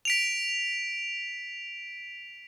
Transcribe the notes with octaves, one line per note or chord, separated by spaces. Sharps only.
B6 D7 F7